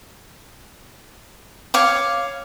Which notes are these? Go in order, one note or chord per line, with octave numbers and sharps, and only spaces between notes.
C#5 F5 D6